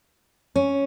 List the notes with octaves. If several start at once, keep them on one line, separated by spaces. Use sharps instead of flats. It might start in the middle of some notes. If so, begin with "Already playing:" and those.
C#4